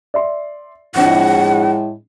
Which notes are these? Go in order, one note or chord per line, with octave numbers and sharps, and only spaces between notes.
D5 E5 C6
A2 F3 G#3 C4 D4 E4 F#5